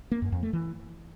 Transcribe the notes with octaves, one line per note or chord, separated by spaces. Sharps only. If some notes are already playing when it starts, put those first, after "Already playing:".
A#3
F#2
F2
A3
E3